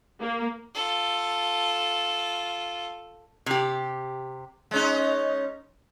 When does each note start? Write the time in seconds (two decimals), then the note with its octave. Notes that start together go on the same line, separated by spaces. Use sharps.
0.20 A#3
0.74 F4 A4
3.46 C3 G4
4.71 G#3 C#4 D#4